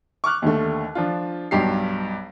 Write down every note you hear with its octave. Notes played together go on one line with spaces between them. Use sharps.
C#6 D6 F6 F#6
D#2 D3 A3
F3 D4 F4
B1 G2 G4 C7